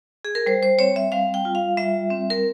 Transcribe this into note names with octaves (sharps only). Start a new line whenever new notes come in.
G#4
A#4
G3 C5
C5
C4 C#5
E5
G3 F5
G5
F4
F5
G3 E5
C4
A#4